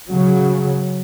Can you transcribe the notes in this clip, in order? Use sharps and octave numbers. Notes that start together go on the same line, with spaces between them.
C#3 F#3